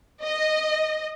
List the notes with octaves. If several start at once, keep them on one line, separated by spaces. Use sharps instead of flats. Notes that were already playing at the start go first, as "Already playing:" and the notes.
D#5